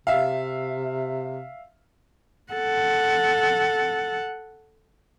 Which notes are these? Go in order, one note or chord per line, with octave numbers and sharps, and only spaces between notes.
C3 E5 F5
A4 F#5